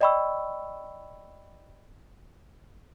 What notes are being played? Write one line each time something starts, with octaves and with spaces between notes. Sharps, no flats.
D5 D#5 G5 B5 C#6 E6